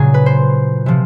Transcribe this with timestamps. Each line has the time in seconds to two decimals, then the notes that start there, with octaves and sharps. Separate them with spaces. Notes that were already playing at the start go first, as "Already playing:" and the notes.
Already playing: A#2 C#3 F#3 G#4
0.14 B4
0.26 C5
0.86 C3 F3